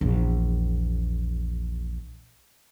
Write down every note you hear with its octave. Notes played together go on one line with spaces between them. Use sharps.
A#1 E2